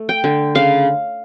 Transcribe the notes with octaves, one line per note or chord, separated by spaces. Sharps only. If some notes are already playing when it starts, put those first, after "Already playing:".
Already playing: A3
G5
D3
C#3 F5